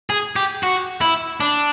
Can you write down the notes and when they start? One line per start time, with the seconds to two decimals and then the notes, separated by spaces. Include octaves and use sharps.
0.10 G#4
0.36 G4
0.63 F#4
1.01 E4
1.40 D4